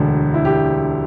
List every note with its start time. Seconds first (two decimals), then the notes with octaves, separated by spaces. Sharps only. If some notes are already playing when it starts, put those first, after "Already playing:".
Already playing: E1 D2 D3
0.34 E4
0.45 G4